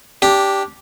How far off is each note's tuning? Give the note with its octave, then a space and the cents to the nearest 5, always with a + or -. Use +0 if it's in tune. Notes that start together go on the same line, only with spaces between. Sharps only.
D4 -15 G4 +0